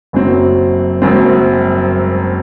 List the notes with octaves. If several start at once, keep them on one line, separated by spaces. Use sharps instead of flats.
F#1 F#2 F#3 C4
F#1 F#2 F#3 C4